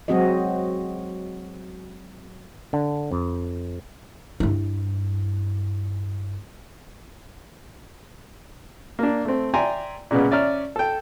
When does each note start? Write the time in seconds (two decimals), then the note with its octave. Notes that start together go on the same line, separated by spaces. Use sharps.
0.08 F#3 G#3 C4 F#4 G#4 D#5
2.73 D3
3.12 F2
4.40 G2 E4
8.99 A#3 D4
9.25 A3 C4
9.54 D5 E5 G5 G#5 A#5 C6
10.11 A#2 C#3 G#3 B3
10.31 C#4 D5 E5 A#5 F6
10.76 A4 G5